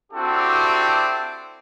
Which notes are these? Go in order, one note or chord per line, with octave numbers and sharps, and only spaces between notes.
C4 D4 E4 F#4 G4 A4